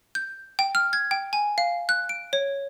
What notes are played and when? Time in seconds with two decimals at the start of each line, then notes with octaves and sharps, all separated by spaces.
0.15 G6
0.59 G5
0.75 F6
0.93 G#6
1.11 G5
1.33 G#5
1.58 F5
1.89 F#6
2.09 D7
2.33 C#5